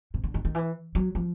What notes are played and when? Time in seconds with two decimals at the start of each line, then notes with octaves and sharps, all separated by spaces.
0.14 C3
0.24 D3
0.34 D#3
0.45 D#3
0.55 E3
0.95 F#3
1.15 F3